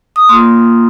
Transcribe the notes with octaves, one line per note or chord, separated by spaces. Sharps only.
D#6
A#3 F4 C6